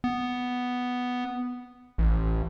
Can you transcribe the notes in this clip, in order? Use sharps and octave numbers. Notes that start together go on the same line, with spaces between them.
B3
A1